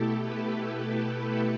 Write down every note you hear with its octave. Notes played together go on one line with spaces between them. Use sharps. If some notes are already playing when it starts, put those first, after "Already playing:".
Already playing: B2 A3 E4 G4 A4
B4
A4